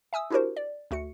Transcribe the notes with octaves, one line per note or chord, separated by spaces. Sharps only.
E5 G#5 D#6 E6
D4 E4 F#4 G4 A#4 C5
D5
D2 A3 F#4 C#7